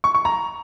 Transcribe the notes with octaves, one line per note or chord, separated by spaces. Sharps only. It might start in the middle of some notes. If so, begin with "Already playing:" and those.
C#6
C#6
A#5